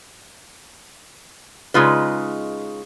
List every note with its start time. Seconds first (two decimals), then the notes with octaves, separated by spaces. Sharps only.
1.74 C#3 G#3 D#4 F4 B4